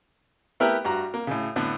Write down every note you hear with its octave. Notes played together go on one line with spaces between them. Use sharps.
A3 B3 E4 G4 A#4 B4
G2 F#4 A#5
A#3
A2 C#3
A2 D3 B3